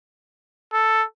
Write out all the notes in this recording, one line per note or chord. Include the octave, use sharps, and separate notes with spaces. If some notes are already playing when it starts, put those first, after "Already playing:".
A4